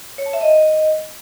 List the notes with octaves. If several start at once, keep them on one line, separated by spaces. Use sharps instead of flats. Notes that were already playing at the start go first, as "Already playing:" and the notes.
C#5
A5
E5
D#5